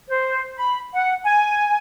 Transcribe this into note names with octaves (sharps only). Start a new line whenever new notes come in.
C5
B5
F#5
G#5